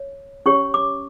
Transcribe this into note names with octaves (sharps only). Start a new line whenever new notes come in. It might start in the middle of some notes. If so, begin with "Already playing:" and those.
Already playing: C#5
C#4 G4 C#5 C#6
D6